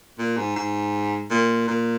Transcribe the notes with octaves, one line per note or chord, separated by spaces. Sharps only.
A#2
G#2
G#2
A#2
A#2